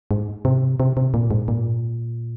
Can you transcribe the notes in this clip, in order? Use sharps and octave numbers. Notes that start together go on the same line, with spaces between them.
G#2
C3
C3
C3
A#2
G#2
A#2